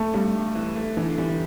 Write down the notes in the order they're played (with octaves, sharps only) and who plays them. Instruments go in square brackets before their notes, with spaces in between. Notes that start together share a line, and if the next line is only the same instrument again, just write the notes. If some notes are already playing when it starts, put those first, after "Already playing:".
Already playing: [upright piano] A3
[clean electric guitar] G2 [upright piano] G3
[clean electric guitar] G2
E3
A3
[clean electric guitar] D3 [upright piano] E3
[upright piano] E3 [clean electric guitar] G3